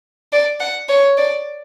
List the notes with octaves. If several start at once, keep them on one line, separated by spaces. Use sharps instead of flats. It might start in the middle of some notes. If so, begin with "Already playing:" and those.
D5
F#5
C#5
D5